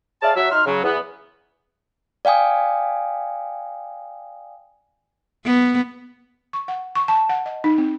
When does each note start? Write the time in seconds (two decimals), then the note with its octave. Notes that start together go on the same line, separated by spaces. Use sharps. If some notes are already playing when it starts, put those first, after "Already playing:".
0.22 G#4 C#5 D5 E5 F5 A5
0.36 F#3 E5
0.52 D#4 C6 F6
0.66 C#3 F#3
0.84 E2 B3
2.25 D5 F5 G5 G#5 D#6
5.45 B3
6.53 C#6
6.68 F#5
6.95 C#6
7.08 A5
7.29 F#5
7.46 D#5
7.64 D#4
7.78 C4